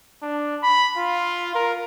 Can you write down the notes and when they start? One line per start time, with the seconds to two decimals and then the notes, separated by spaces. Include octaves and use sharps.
0.22 D4
0.63 B5
0.97 F4
1.55 A#4